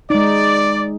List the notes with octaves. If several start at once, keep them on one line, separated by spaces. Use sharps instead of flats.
G#3 D#4 D5